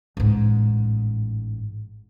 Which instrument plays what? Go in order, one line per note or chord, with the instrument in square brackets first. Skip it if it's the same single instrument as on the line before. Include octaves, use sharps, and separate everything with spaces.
[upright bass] A1 G#2